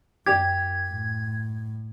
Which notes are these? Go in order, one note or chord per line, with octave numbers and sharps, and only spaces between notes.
F#2 G4 G#6
A2